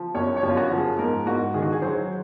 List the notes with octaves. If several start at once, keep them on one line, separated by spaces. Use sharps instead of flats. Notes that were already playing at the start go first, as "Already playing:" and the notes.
Already playing: F3
F#2 C#5
C#5
F#2
F4
F#4
F3
G#4
G#2 A#4
G#2 F#4
D#3 G#4
F#4
G#4
F#3 C5